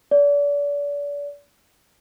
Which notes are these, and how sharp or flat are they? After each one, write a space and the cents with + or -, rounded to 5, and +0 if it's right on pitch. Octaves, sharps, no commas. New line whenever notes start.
D5 -35